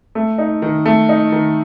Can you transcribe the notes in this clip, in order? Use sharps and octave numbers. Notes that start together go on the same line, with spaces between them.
A3
D#4
D#3
A3
D#4
D#3